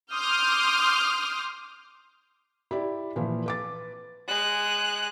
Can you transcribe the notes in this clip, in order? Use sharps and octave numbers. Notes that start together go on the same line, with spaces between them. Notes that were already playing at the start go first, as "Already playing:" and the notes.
C6 D6 D#6 F6 G6
E4 G4 D5
A#2 E3 F3
B4 D6 A6
G#3 F#6